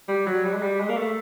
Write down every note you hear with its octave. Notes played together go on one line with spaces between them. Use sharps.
G3
F#3
G3
G#3
G3
G#3
A#3
A3